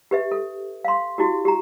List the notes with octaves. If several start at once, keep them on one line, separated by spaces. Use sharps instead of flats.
G4 B4 E5
A4
F5 C6
E4 F#4 G4
G4 A#5